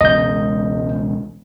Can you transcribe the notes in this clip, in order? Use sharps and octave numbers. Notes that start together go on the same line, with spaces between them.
E1 C#2 D#5 G6